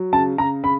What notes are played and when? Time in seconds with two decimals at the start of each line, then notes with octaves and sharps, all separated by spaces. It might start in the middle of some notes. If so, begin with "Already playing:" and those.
Already playing: F#3
0.13 C#3 A5
0.38 C#3 A#5
0.63 C#3 B5